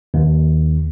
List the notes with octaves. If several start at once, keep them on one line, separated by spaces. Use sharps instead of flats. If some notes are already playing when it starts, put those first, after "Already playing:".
D#2